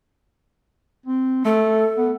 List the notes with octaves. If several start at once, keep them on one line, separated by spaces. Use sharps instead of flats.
C4
A3 A4
B3